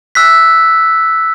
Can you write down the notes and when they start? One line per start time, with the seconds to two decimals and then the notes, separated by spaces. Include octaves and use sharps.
0.15 E6 F#6 B6